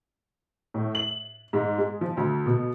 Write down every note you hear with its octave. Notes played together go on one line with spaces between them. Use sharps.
A2
F#7
G#2
G#3
F3
D2
B2